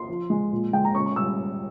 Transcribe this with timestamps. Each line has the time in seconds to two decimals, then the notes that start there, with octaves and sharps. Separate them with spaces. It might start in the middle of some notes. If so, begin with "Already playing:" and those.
Already playing: C6
0.09 F3
0.30 G#3
0.52 A#2
0.73 G#3 G5
0.85 A#5
0.95 C#4 C#6
1.06 C#6
1.16 G3 E6